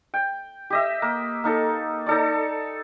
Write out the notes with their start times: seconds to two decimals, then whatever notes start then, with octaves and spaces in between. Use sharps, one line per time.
0.14 G5
0.70 G4 D#5 E5
1.02 A#3
1.44 A#3 D#4 A4
2.06 D#4 A4 D5